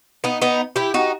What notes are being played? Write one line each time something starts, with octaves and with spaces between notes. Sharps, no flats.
B3 D#4
B3 D#4
E4 G4
D#4 F#4